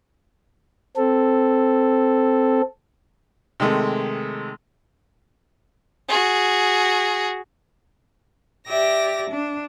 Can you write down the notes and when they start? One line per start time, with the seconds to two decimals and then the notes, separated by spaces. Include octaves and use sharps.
0.97 C4 A4
3.60 C3 D#3 G#3 A3
6.08 F#4 G#4
8.66 G4 D5 E5 A#6
9.29 D4